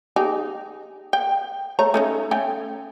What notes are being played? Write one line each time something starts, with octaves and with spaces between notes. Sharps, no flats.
D#4 G4 G#4
G5
A3 C#5 A#5
A3 C#4 D#4
A3 C#4 G5